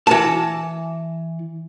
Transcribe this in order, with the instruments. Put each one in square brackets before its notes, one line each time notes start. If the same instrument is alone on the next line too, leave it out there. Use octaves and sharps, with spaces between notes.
[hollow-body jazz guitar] E3 A5